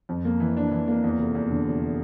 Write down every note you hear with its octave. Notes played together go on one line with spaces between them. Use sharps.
F2
A#3
E3
D4
E3
A#3
E2
F1
E2
D3
F1